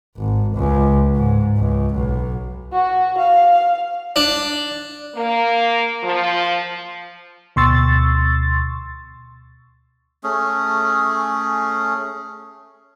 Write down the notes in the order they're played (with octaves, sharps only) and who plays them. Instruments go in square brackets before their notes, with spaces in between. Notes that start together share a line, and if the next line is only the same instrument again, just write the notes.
[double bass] G#1
C#2
G#2
C#2
B1
[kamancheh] F#4
F5
[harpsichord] D4
[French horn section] A#3
F3
[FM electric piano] D2 B2 C6 C#6 E6 A6
[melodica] A3 C#4 G#4